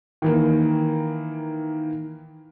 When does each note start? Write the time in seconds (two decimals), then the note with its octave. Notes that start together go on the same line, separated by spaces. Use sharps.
0.22 D#3 E3 A#3